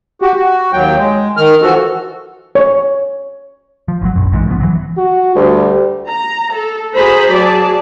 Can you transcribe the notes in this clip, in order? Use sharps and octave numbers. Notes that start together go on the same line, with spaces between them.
F#4 G4
F#4
D#2 F#3 G5
G#3
D#3 F6
E3 F3 F#4 A4
C#5
F3
G#1 F#3
A#1 F#2
A#1 G#2 E3
C#3 F3 A3 B3
E3 F#3
F#4
D2 G3
A#5
A4
F#4 G#4 C5 A#5 B5
F#3 G#4 D5 A5